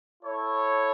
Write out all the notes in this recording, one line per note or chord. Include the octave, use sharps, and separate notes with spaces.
E4 A4 C#5